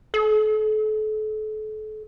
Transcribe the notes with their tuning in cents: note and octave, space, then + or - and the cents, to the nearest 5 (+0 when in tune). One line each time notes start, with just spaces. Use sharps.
A4 -35